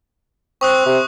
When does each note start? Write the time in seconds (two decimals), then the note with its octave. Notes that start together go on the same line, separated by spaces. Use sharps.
0.61 C4 C#6 D#6 F#6
0.86 C3